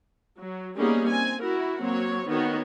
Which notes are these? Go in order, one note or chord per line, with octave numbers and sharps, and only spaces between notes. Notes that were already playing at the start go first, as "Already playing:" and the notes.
F#3
G3 A#3 B3 C#4 D#4 G#4
C4 G#5
E4 F#4 A#4
F#3 A#3 C4 C#5
D#3 B3 F#4 C#5